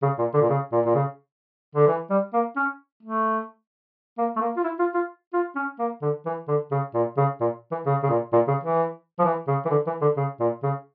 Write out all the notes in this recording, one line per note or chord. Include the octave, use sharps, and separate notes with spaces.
C#3
A#2
D3
A#2
C#3
A#2
A#2
C#3
D3
E3
G3
A#3
C#4
A3
A#3
A3
A#3
F4
E4
F4
F4
F4
C#4
A#3
D3
E3
D3
C#3
A#2
C#3
A#2
E3
C#3
C#3
A#2
A#2
C#3
E3
F3
E3
C#3
E3
D3
E3
D3
C#3
A#2
C#3